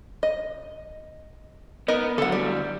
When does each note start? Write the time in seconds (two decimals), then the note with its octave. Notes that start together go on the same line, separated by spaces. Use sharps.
0.23 D#5
1.88 B3 D#4 A#4 D#5
2.18 D3 F#3 A4 F#5
2.32 G3